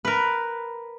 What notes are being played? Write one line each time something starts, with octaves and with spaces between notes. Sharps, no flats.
A#4 B4